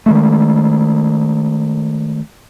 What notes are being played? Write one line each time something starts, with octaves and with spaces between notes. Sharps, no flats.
D#3 G#3 A3